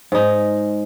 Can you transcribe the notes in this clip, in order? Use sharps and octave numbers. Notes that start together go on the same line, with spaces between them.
G#2 D#4